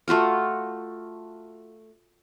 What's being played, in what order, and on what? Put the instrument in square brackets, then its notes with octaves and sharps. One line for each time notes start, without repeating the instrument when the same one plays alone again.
[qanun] A3 F4 F#4 F5